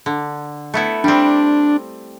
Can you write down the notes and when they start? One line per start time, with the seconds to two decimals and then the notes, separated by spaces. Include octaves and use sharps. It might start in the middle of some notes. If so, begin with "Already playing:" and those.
0.06 D3
0.74 A3 B3 E4
1.04 G3 C4 D4